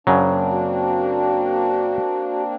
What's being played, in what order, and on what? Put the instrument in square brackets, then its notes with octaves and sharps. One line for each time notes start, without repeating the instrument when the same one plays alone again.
[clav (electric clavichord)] F#2 C#3 F#3 [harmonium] A#3 C4 D4
[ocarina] F#4